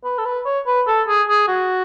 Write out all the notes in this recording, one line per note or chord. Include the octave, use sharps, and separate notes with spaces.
B4
A4
B4
C#5
B4
A4
G#4
G#4
F#4